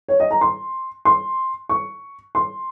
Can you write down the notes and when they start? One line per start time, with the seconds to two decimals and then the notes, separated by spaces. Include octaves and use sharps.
0.08 C#5
0.20 D#5
0.31 A#5
0.41 C6
1.05 C6
1.69 C#6
2.35 C6